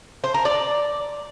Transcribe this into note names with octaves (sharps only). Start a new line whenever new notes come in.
C5
A#4
D5